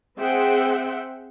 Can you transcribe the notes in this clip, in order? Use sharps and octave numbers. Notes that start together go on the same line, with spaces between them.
C4 G#4 C5 E5 F#5 G5